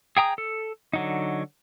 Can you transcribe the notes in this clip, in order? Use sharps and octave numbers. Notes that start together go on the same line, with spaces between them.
G#4 G5 A#5 D#6
A4
D3 F#3 D#4